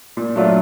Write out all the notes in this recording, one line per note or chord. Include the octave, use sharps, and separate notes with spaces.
A#2
F#3 A3 D4 F4